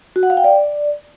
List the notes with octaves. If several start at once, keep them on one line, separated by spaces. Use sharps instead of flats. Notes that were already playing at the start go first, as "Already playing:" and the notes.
F#4
F#5
F5
G5
D5